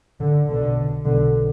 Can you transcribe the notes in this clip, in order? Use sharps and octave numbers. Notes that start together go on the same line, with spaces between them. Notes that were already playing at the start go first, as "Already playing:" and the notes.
D3
B1 B2 D3
B1 B2 D3